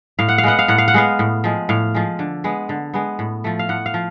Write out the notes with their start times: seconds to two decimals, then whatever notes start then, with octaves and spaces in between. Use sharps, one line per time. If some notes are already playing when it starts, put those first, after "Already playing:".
0.19 A2 F5
0.29 F#5
0.38 F5
0.43 G#3 B3 F#5
0.59 F5
0.68 A2 F#5
0.78 F5
0.88 F#5
0.94 G#3 B3 F5
1.19 A2
1.44 F3 G#3
1.69 A2 F5
1.94 F3 G#3
2.19 D3
2.44 G#3 B3
2.69 D3
2.94 G#3 B3
3.19 A2
3.44 F3 A3
3.59 F5
3.69 A2 F#5
3.86 F5
3.94 F3